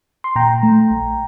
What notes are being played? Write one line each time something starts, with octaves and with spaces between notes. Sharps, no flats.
C6
A#2 G5 A#5
A3
A#1